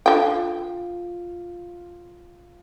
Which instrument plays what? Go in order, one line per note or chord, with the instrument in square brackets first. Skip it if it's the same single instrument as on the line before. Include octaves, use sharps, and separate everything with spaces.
[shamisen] D3 G5 [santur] F4